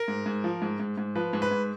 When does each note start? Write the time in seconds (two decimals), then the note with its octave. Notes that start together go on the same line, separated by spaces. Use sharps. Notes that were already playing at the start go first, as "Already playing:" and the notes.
Already playing: A#4
0.08 G#2
0.26 G#2
0.44 F3
0.62 G#2
0.80 G#2
0.98 G#2
1.15 F3 B4
1.33 G#2
1.42 B4
1.51 G#2